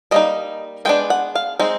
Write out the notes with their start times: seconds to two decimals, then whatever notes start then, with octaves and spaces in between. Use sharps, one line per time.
0.11 G3 A#3 D#4 D#5
0.85 G#3 B3 D4 G5
1.10 F#5
1.35 F5
1.59 G#3 C4 D#4